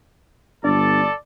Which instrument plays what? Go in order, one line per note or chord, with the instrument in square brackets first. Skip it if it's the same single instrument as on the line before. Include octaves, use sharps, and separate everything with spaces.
[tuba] G1 [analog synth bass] D4 [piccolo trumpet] A4 [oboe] D5